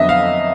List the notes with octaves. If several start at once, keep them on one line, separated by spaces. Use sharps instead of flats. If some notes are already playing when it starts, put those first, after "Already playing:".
Already playing: F2 D3 F#3 B3 D#5 E5
F5